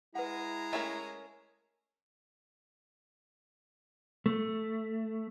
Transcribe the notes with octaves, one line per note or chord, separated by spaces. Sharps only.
G#3 E4 B4 F#5 G#5 A#5
A3 C#4 A#4
A3